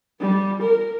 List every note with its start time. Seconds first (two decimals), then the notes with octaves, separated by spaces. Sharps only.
0.20 G3
0.63 A#4